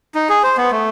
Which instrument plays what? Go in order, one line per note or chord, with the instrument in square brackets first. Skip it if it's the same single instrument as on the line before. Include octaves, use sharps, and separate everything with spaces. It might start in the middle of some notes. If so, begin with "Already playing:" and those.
[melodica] D#4
G#4
C5
B3
A3